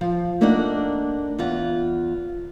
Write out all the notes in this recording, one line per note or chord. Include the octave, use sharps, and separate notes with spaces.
F3
A3 A#3 D4 D#4 A#4 F#5
E2 F4 F#5